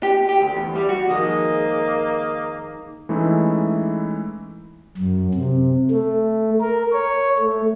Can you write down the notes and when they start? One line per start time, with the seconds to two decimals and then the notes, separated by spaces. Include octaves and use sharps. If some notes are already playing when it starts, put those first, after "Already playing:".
0.03 G4
0.29 G4
0.41 D2
0.56 E2
0.75 G3
0.89 F#4
1.09 F2 D#3 G#3 A#3 D#5
3.09 E3 G#3 A3 C#4 D#4 E4
4.97 F#2
5.35 C3
5.91 A3
6.61 A#4
6.92 C#5
7.39 A3